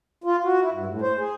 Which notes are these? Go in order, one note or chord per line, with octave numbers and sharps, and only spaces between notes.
F4
F#4
E4
G2
A2
C5
G#4